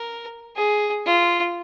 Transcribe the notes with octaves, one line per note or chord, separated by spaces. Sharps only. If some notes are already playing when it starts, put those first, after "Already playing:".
Already playing: A#4
G#4
F4